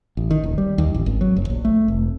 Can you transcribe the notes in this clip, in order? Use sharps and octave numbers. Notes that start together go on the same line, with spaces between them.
A1
D#3
D#1
G3
D#2
A1
G#1
F#3
F#1
A#1
A3
F1